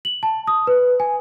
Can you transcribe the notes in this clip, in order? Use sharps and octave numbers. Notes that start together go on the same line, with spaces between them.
F#7
A5
D#6
B4
G#5